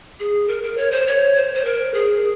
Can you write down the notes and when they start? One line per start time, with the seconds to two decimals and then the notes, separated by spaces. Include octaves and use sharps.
0.20 G#4
0.48 A#4
0.63 A#4
0.77 C#5
0.91 C5
1.07 C#5
1.36 C5
1.54 C5
1.65 A#4
1.94 G#4